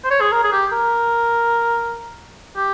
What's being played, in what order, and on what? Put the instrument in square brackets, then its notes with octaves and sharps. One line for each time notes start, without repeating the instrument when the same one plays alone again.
[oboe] C5
C#5
G#4
A#4
G#4
G4
A#4
G4